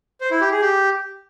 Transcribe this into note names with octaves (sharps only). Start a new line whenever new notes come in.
C5
E4
G4
G#4
G4